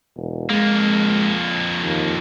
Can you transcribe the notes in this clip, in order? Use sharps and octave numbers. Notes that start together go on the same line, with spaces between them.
E1
F2 G#3 A#3
D#2